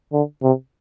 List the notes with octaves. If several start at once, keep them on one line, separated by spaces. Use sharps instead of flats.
D3
C3